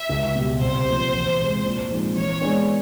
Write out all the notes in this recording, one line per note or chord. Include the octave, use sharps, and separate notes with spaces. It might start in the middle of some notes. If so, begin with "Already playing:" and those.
Already playing: E5
C#2
B2 G3
C2 C5
A#2 F3 A3
E2
C3 E3 G#3
A#2
F3 G#3 C4 D#4
E3 C#5
G#3 B3 D4